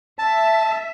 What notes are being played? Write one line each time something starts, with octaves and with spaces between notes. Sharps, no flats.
E5 A5